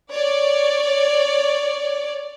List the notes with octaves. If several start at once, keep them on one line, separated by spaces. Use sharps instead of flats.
C#5 D5